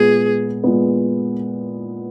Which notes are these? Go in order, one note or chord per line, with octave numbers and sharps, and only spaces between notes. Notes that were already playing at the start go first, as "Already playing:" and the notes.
Already playing: A#2 G#3 B3 G#4
A#2 G#3 B3